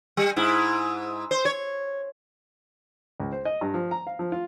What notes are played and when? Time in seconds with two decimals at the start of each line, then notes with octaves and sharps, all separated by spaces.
0.17 G3
0.36 G#2 E4
1.31 C5
1.45 C#5
3.20 C#2
3.32 C5
3.45 D#5
3.61 G2
3.74 F3
3.91 A#5
4.07 F5
4.19 F3
4.32 F4